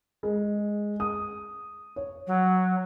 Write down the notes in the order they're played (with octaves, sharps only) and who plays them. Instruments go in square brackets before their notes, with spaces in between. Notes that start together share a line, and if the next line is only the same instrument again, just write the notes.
[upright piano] G#3
D#6
C#5
[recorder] F#3